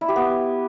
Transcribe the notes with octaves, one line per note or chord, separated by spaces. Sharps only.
E4
G4
B3